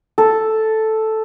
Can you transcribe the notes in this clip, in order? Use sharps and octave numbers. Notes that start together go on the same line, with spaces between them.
A4